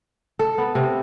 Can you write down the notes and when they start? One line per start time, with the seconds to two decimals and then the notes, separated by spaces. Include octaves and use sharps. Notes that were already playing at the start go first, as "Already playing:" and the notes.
0.39 A4
0.58 B3
0.75 C3